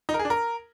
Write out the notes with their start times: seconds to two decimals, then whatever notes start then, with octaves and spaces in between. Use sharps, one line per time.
0.09 D#4
0.14 A#4
0.19 G#4
0.25 D4
0.30 A#4